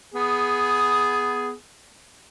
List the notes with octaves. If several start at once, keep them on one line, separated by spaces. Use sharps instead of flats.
B3 G#4